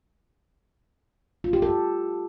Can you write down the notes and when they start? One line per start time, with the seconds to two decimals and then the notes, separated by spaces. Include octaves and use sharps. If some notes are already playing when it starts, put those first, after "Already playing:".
1.44 F4
1.53 G4
1.62 A4